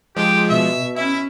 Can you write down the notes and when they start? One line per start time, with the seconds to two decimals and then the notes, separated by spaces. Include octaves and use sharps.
0.16 F3 G#3 G4
0.49 B2 E5
0.96 C#4 E4 E5